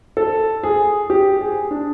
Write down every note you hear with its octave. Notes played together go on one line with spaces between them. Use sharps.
A4
G#4
G4
G#4
D4